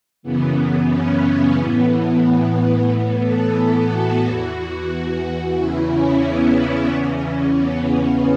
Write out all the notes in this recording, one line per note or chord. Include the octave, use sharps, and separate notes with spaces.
F#2 C#3 E3 B3
C#4
B3
A2 E3 B3
B3
B3
A2 E3 B3
A4
A4
F#4
E2 E3 F#4
E2 C#3 E3 E4
C#4
B3
E2 C#3 E3 C#4
B3
B3